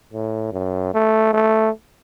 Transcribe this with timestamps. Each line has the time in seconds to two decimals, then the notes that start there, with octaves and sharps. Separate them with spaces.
0.13 A2
0.53 F#2
0.94 A3
1.34 A3